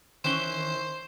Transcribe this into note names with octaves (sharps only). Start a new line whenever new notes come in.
D#3 E3 C#4 C5 E7 G7